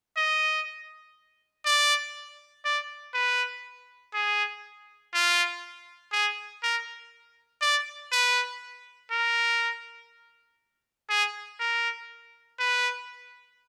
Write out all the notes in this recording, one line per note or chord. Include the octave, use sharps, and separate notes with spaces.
D#5
D5
D5
B4
G#4
F4
G#4
A#4
D5
B4
A#4
G#4
A#4
B4